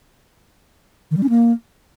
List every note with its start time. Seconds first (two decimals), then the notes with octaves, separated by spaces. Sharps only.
1.11 D#3
1.17 G3
1.23 C#4
1.29 A#3